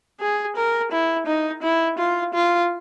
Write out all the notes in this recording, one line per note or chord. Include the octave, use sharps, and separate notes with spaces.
G#4
A#4
E4
D#4
E4
F4
F4